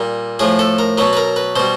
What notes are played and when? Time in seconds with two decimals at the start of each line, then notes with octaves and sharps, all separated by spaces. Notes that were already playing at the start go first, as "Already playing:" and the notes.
Already playing: A#2 G3
0.39 A2 F3 G#4
0.59 A4
0.79 A#4
0.98 B2 F#3 B4
1.13 B4
1.17 A#4
1.36 B4
1.56 B2 G3 C5